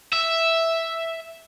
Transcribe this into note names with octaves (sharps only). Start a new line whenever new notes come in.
E5